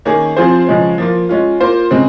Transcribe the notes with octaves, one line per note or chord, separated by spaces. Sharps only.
D#3 A#3 C#4 G#4 C#5
F3 C4 F4 G#4 C5
C#3 F3 G#3 C#4
F3 A#3 F4
G#3 C#4 F4
A#3 F4 C5
C#3 G#3 C4